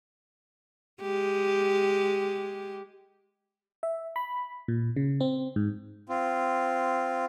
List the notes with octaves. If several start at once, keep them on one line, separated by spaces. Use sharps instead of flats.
G#3 G4
E5
B5
A#2
C#3
C4
G#2
C4 F4